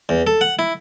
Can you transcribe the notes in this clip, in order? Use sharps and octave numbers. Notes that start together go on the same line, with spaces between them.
E2
A4
F#5
E4